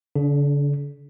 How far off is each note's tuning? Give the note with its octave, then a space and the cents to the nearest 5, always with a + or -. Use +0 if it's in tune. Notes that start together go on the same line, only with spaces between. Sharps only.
D3 -45 D4 +0